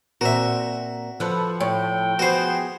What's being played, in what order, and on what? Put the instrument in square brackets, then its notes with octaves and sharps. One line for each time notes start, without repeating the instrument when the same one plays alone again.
[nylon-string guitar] A#2 C4 A#4 [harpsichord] F#4 E5
[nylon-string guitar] F3 [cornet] A4 [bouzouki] B4 F#5
[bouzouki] A2 [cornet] G5
[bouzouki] B3 G#4 [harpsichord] F#4 C5